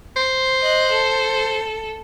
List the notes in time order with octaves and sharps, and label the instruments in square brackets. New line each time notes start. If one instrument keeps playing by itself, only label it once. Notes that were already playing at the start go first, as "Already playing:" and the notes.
[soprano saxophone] C5
[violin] D#5 F#6
A4